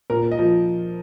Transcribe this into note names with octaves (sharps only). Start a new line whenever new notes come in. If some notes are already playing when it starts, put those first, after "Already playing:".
A#2 A#4
D#5
F3